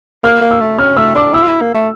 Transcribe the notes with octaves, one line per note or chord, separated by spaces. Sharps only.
A#3 F6
A#3
E6
A3
C#4 F6
A3 E6
D4 D6
E4 E6
F4
E4
A#3
A3